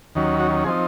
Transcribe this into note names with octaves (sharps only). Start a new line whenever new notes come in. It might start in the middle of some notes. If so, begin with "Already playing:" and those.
D#2 D#3 F#3 C#4
F#4
F3 C4 D#4 G#4